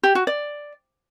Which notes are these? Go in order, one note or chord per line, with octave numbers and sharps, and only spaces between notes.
G4
F#4
D5